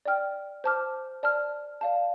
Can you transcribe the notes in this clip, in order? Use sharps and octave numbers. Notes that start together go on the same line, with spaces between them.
D5 G5 F6
C5 A5 D6 F6
D5 A5 F6
D5 F5 A5